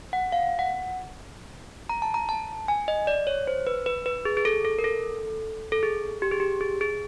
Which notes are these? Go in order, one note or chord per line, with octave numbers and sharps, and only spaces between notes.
F#5
F5
F#5
A#5
A5
A#5
A5
G#5
D#5
D5
C#5
C5
B4
B4
B4
G#4
G#4
A4
A4
A#4
A4
A4
G#4
G4
G#4
G4
G#4
G#4